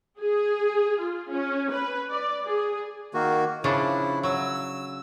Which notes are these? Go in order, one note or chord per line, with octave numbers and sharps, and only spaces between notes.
G#4
F4
C#4
B4
D5
G#4
D#3 A#3 F#4
C#3 F3 D4 E4
F#3 E6